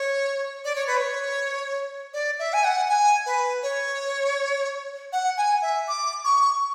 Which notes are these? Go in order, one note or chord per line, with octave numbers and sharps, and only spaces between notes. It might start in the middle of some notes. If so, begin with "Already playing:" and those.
Already playing: C#5
D5
C#5
B4
C#5
D5
E5
G#5
F#5
G#5
B4
C#5
F#5
G#5
E5
D6
C#6